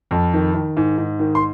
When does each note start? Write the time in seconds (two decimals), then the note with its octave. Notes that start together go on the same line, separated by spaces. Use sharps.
0.11 F2
0.34 D#3
0.54 D#3
0.77 G#2
0.98 G#2
1.19 D#3
1.35 C6